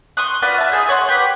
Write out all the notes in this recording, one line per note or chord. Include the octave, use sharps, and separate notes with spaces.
C6 C#6 D#6 F#6
F4 F#4 B4 D5
E5 A5
D#4 G#4 E5
C#5 F#5 A#5 C6
G4 B4 F#5